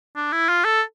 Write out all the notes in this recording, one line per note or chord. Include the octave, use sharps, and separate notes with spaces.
D4
E4
F4
A4